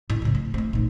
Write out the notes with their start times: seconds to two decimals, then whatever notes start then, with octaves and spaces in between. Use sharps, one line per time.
0.10 A2
0.22 C#3 C4
0.35 A3
0.54 A3 C4
0.73 A#2 D#4